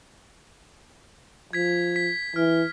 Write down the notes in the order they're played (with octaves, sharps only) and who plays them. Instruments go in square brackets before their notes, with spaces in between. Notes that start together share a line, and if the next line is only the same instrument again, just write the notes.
[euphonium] F3 [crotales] G#6 B6
[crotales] B6
[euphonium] E3 [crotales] F6